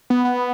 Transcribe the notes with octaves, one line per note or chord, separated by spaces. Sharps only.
B3
B3